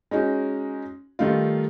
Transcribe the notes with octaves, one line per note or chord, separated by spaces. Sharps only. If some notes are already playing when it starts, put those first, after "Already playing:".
G#3 C#4 D#4 F#4
D#3 G3 A3 D#4 F4